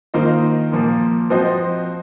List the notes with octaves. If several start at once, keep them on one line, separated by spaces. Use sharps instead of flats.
D#3 A#3 F4 C5 D#5
A#2 F3 A#3
F3 C4 F#4 C5 D#5